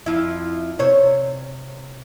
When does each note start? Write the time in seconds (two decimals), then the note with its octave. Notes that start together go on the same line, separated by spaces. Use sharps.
0.06 F2 F3 E4
0.79 C3 C5 C#5